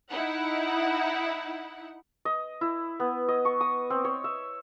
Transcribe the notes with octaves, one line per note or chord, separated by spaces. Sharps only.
D#4 E4 F#5
D#5
E4
B3
D#5
C#6
D#6
C4
C#5
E5